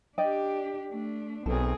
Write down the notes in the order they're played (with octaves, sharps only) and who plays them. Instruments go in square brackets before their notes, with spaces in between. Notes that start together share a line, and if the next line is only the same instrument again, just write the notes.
[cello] D4 G4 [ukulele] D5 D#5 G5
[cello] A3 D4
[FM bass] B1 [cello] C4 G#4 [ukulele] A4